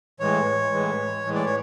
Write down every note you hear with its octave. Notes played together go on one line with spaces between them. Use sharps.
A2 E3 G#3 C#5
A2 E3 G#3
A2 E3 G#3
D5
C#5